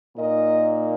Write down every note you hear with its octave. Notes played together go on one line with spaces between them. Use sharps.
A#2 A#3 D#4 A#4 D#5